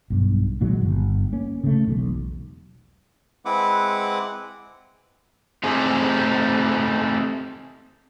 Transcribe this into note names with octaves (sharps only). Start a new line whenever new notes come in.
B1 G2
A#2 D#3 F#3 G#3
G1
A#3 C#4
C#3 A3
E1 B1
G#3 C4 E4 B4 F#5 D6
A3 C4 D#4 G4 G#4